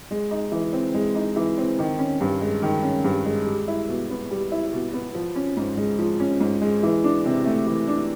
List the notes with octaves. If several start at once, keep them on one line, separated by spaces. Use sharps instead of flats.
G#3
D#4
E3
C4
G#3
D#4
E3
C4
D#3
C#4
G2
G#3
D#3
C#4
G2
G#3
G3
E4
B2
B3
G3
E4
B2
B3
F3
C#4
G#2
G#3
F3
C#4
G#2
G#3
E3
D4
C3
A3
E3
D4